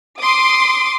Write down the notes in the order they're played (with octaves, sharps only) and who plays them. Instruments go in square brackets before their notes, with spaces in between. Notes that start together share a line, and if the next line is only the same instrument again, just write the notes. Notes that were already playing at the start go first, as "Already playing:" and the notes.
[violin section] C6 D6 D#6